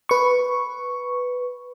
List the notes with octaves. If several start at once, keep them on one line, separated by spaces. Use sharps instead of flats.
B4 C#6